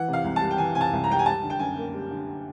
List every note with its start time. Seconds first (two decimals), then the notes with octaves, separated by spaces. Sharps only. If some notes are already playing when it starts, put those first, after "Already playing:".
Already playing: E3 F#5
0.08 C3
0.13 F5
0.24 C2
0.36 A5
0.41 G3
0.51 G5
0.58 E3 G#5
0.75 C3 G#5
0.81 A5
0.93 C2
1.04 A#5
1.10 G3 G5
1.19 G#5
1.26 G3 A5
1.43 D3
1.50 G5
1.59 F#2 G#5
1.77 A#3
1.94 G3
2.11 D3